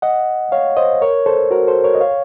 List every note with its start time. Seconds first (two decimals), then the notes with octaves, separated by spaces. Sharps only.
0.02 D#5 F#5
0.52 C#5 F5
0.77 C5 D#5
1.02 A#4 C#5
1.26 A4 C5
1.51 F#4 A#4
1.68 A4 C5
1.84 A#4 C#5
1.95 D#5
2.01 C#5 F5